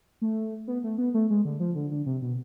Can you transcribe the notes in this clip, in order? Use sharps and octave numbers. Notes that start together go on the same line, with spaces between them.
A3
B3
A3
B3
A3
G#3
D3
F3
D3
D3
C3
B2